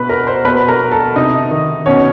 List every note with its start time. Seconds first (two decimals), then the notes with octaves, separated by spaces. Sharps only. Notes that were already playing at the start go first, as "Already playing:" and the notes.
Already playing: B2 B4 B5
0.09 A#4 A#5
0.27 C5 C6
0.45 B2 B4 B5
0.68 A#4 A#5
0.92 A4 A5
1.16 C3 D#4 D#5
1.51 D#3
1.86 B2 C#4 C#5